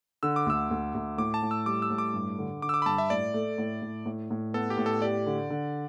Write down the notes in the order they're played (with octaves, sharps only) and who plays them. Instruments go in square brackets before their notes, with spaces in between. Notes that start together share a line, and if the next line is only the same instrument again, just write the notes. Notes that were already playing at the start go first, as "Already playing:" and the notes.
[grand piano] D3 [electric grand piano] E6
[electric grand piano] D6
[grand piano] D2 [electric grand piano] E6
[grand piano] D2
D2
[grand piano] A2 [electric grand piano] D6
[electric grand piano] A5
[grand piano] A2
[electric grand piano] E6
[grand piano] G3 [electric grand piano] D6
[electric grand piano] E6
[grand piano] A2
[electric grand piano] D6
[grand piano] G2
D3
[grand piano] D3 [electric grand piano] D6
[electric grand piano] E6
D6
B5
[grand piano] G2 [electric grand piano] A5
[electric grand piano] E5
[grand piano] A2 [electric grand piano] D5
[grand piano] A3
A2
A2
A2
A2
[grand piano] B3 [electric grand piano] A4
[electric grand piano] G4
[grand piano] A2
[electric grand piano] A4
[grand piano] G4 [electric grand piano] D5
[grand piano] D3
D3